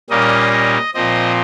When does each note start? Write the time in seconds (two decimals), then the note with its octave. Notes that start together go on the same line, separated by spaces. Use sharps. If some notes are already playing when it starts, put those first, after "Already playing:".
0.10 A#2 G3 A#3 C#4 D#5
0.52 D#5
0.94 A#2 F3 C4 D#5